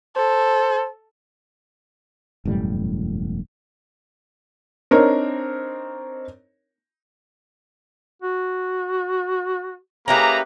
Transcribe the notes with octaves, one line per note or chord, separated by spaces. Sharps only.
A4 C5
E1 F#2 A2 G3
C4 D4 D#4 A#4 C#5
F#4
A#3 C#4 E4 G4 G#4 B4 A#5